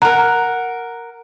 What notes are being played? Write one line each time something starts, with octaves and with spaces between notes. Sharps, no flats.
A#4 F#5 A#5